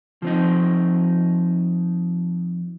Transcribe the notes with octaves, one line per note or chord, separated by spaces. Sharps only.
F3 C4 D#4